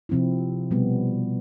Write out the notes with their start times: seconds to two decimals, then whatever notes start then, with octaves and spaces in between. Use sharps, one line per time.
0.09 C3 F3 C4 E4
0.71 B2 G3 B3